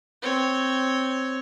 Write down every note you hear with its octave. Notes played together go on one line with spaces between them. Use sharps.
C4 C#5